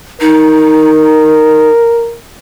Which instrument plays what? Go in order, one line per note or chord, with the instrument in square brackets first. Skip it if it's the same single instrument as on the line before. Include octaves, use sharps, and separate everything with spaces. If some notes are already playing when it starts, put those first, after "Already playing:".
[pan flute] D#4 [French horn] A#4